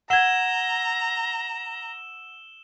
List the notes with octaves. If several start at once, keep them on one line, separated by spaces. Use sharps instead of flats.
F#5 A#5 E6 G#6 E7 G7